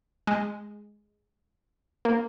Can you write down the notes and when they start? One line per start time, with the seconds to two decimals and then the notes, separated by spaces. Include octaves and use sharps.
0.27 G#3
2.05 A#3